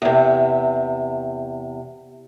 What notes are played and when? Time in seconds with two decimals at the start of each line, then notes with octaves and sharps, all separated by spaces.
0.02 E2 C3